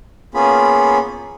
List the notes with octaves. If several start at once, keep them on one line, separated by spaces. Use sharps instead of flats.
A#3 B3 C#4 F4 G#4 B5